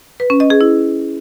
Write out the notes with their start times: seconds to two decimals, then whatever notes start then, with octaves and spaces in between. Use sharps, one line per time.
0.20 B4
0.30 C#4
0.40 D#5
0.50 G#4
0.61 E4